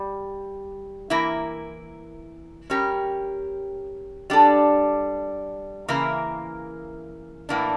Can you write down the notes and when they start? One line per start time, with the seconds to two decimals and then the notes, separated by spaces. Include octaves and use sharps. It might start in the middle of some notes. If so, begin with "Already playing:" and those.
Already playing: G3
1.10 E3 A#3 E4 A#4
2.70 G3 C#4 G4 A#4
4.30 G3 D4 A4
5.88 C#3 E3 A#3 E4 A#4
7.49 A2 E3 A#3 D4